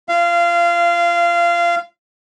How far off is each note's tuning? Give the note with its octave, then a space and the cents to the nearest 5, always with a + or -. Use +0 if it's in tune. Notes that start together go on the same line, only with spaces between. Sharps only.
F4 -35 F5 -20